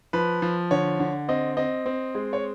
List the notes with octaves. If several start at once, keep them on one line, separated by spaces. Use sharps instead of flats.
F3 B4
F3
D3 C#5
D3
C4 D#5
C4 D#5
C4
G#3
C#5